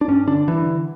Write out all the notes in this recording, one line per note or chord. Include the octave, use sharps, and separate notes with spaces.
D4
G2 C#4
D3 D4
G2 E3
D3